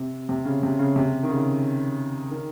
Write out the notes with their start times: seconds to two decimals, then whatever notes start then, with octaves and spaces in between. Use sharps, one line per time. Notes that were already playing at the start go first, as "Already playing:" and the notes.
Already playing: C3
0.29 C3
0.45 C#3
0.63 C3
0.79 C#3
0.96 C3
1.23 D#3
1.30 C#3
2.31 D#3